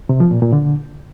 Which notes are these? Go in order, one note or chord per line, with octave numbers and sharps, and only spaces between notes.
C3
F3
A#2
A#2
D3